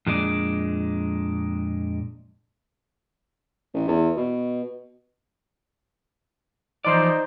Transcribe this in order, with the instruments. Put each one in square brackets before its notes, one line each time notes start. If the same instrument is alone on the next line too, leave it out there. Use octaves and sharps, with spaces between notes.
[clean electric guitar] F2 A#2 G#3 D4
[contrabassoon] A1
E2
B2
[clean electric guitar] E3 F3 D5 [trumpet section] D#4 C5